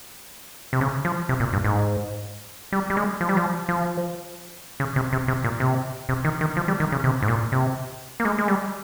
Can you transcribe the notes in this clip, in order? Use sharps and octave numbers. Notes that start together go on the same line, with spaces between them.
C3
C#3
F3
C3
A#2
G2
G#2
G3
G3
G#3
F3
G3
F3
F3
C#3
C3
C3
C3
A#2
C3
C3
D#3
D#3
F3
G3
D#3
C#3
C3
G#2
A#2
C3
A#3
G#3
G#3
G3